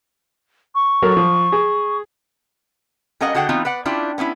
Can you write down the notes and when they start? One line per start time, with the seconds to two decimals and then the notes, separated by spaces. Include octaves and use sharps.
0.75 C#6
1.02 F#3 A4 A#4
1.17 F3
1.52 G#4
3.21 G3 C#4 A#4 D#5 F5 F#5
3.35 D3 F#4 G#4 F#5 G5
3.49 E3 B3 C4 D#4 F4 F#4
3.65 B4 D5 F#5
3.85 C#4 D4 E4 F4 G4 D5
4.18 B3 C#4 D#4 E4